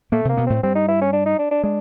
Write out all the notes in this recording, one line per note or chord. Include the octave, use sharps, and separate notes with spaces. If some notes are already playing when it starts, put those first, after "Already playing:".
A#2 A3 A#3
C3 A#3 C4
B2 B3
A2 A3 C4
G2 G3 C4
D#4
E4
C#4
D4
D#4
D4
D4
G#3 D4